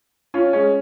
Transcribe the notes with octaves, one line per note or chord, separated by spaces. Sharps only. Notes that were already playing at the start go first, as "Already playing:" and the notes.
C#4 F4
G#3 C#4